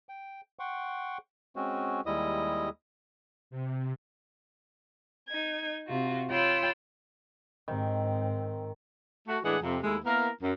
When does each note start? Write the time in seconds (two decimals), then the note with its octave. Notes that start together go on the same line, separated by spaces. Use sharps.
0.09 G5
0.59 F#5 G5 C6 C#6
1.56 G#3 C4 C#4 F#4
2.06 D#2 G3 G#3 E4 D#5 D#6
3.51 C3
5.27 D#4 G#6
5.88 C3 F4 F#4
6.30 F4 C#5 G5 B5 C6 E6
7.68 G#2 D#3 C4
9.28 A3 F#4
9.44 A2 E3 G#3 D4 G#4 F#5
9.63 F2 C3
9.83 D#2 G#3 A3 E4
10.05 A#3 B3 E4 A#4
10.43 F#2